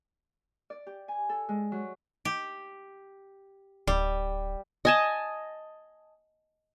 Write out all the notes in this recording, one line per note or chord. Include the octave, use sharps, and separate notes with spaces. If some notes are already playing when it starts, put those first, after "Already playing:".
D5
G4
G#5
A4
G#3
F#3
G4
D1 G3
D#5 G#5 A5